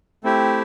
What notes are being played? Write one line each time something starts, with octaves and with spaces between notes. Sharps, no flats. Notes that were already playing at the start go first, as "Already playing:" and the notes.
A3 C4 E4 G4